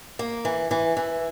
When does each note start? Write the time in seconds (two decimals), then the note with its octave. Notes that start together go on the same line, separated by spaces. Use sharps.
0.19 A#3
0.45 E3
0.71 E3
0.97 E3